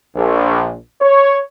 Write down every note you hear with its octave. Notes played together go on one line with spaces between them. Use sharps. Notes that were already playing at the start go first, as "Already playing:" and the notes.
A#1
C#5